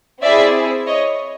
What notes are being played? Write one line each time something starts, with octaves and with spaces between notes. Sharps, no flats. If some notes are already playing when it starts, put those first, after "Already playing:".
C4 E4 G#4 D5 E5
C#5 D#5